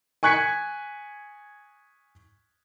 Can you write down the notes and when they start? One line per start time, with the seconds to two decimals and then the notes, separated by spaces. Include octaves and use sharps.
0.23 G#5 C#6 F#6 G#6 B6 C#7